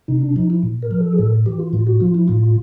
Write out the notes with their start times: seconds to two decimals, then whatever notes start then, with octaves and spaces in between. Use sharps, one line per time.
0.08 C3 D#4
0.22 D4
0.36 F3 D#4
0.50 E4
0.63 A#2
0.82 A#4
0.91 F3
1.00 A4
1.13 G#4
1.18 A2 A4
1.46 E3 G4
1.59 F4
1.73 A2 F4
1.87 F#4
2.00 F3 F4
2.14 E4
2.28 A2 F4